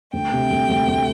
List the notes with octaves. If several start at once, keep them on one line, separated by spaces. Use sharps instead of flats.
D2 G5
C3
D2
D2
D2